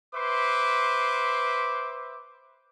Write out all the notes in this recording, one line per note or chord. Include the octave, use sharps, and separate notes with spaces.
B4 C5 E5 C6 D6